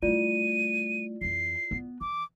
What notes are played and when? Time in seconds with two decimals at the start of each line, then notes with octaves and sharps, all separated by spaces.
0.02 G3 A3 E4 F4 D5 D#7
1.21 F2 E3 C7
1.71 B3
2.01 E3 D6